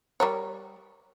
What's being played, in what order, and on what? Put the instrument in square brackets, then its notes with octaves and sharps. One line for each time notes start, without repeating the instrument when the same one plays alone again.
[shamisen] G3 A#4 C#5